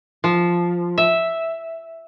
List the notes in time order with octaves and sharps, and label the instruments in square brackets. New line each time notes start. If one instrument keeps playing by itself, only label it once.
[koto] F3
E5